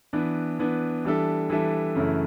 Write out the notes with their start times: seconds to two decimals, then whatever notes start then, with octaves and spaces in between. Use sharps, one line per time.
0.13 E3 B3 D4
0.59 E3 B3 D4
1.05 E3 G3 D4 A4 E5
1.50 E3 G3 D4 A4 E5
1.96 F#2 C#3 E3 A3 E4